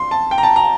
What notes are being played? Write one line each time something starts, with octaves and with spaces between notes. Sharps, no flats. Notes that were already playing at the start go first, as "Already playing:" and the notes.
Already playing: C6
A5
G5
A#5
A5
A#5